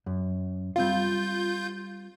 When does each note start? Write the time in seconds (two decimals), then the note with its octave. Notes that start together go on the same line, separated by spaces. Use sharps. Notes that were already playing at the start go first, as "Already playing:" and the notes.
0.06 F#2
0.76 G3 C4 F4 F5 G6